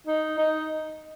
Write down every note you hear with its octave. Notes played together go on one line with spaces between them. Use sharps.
D#4
D#4